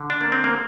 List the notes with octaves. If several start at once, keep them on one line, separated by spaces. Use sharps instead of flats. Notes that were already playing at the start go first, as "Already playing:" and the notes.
Already playing: D3
D4
A#3
C4
A#3